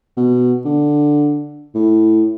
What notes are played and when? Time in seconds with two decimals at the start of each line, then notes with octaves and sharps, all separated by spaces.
0.17 B2
0.65 D3
1.75 A2